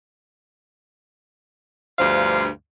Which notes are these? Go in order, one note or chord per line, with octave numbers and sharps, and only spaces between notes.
D2 G2 F3 F5